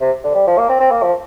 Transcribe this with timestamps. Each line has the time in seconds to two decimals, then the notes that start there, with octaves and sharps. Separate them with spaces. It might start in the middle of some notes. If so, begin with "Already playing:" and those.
0.01 C3
0.24 D3
0.35 G3
0.47 F3
0.58 A#3
0.69 C4
0.80 C4
0.91 A#3
1.03 F3